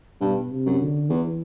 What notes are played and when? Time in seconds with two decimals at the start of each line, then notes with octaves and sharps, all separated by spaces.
0.21 G2 B2
0.51 C3
0.66 F#2
0.81 D3
1.10 E2 E3